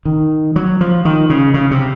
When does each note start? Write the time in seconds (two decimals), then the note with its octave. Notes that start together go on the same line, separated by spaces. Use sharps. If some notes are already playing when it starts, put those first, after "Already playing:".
0.05 D#3
0.56 F#3
0.81 F3
1.05 D#3
1.30 C#3
1.54 C#3
1.71 C3